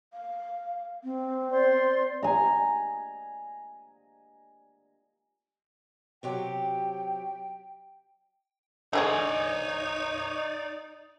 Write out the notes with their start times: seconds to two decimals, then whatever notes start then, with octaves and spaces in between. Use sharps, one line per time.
0.13 F5
1.04 C4
1.51 C5 D5 C6
2.23 G#5 A#5
6.23 C3 F#3 G4 G5
8.93 D3 G#3 D#4 G#4 C#5 D5